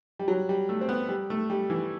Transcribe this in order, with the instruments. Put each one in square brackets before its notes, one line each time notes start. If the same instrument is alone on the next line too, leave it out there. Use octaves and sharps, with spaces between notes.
[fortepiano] G3
F#3
G3
A3
C4
B3
G3
A3
G3
E3